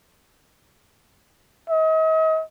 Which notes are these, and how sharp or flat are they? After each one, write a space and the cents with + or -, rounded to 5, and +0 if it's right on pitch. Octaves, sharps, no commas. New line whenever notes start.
D#5 +40